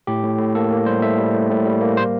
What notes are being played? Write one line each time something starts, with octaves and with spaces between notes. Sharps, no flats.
A2 G4
A2
A2
A#3 A4
A#3
G3 C5
A2 E5
G3
A2
A2
G3
A#3
C5